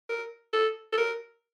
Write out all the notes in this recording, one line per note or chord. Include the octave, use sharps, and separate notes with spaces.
A#4
A4
A4
A#4